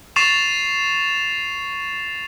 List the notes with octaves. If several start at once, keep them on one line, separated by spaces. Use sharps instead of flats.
C#6 A6 C7 E7 F7